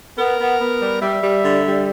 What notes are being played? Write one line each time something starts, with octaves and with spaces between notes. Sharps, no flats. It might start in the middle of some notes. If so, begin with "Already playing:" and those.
B3 A#4
B3
B3
G3
G3 E5
G3
D3
G3